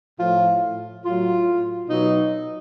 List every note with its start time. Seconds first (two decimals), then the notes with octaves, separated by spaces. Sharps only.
0.20 A2 F3 F4
1.04 A2 F#3 F4
1.88 B2 F#3 D#4